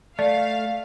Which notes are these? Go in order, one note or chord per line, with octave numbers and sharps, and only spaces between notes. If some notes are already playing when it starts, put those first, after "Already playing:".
A3 D5 F5